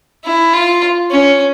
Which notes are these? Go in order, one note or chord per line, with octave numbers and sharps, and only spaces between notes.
E4
F4
C#4